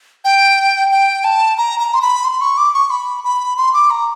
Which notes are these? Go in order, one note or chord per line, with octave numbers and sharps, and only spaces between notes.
G5
G5
A5
A#5
A#5
C6
B5
C6
C#6
D6
C#6
B5
B5
C6
D6
A#5